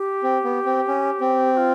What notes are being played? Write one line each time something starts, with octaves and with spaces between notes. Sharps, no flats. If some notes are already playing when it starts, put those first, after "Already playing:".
Already playing: G4
C4
B3
C4
C#4
C4
G4
F4